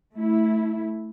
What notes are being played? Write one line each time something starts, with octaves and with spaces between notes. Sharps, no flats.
A3 E4